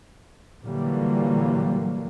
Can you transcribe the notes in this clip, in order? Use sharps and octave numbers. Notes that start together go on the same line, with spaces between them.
A#2 D3 E3 F#3 G3 A#3